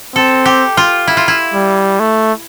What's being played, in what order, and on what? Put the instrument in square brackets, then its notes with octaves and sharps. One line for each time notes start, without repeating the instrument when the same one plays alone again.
[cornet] C4 [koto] A4
[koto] G4
F4
E4
F4
E4
[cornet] G3
A3